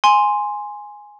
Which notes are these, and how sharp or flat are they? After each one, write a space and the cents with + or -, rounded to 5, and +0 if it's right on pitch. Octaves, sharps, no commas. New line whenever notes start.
G#5 +0 C6 +0